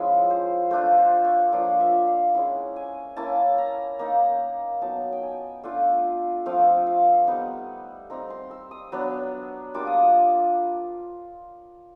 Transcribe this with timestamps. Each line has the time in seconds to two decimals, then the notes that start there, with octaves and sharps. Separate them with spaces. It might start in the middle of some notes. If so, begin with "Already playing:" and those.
Already playing: F3 G#3 C#4 E4 B4
0.30 C5
0.71 A3 D4 F4 C5
0.98 C5
1.25 C#5
1.52 F3 A#3 D4 F4 D5
1.80 E5
2.07 F5
2.35 G#3 C#4 E4 F#5
2.76 G#5
3.16 A#3 C#4 E4 A5
3.58 A#5
3.99 A#3 D#4 A#5
4.81 F#3 B3 D#4 A5
5.13 G5
5.23 G#5
5.64 A3 D4 F4
6.46 F3 A3 C4 F5
6.87 F5
7.27 G3 B3 D#4 F#5
8.10 G3 C4 D#4 A#5
8.30 C6
8.51 E6
8.71 D#6
8.92 F#3 B3 D4
9.74 G3 A#3 D4 F4 D6
9.87 D#6
10.00 D6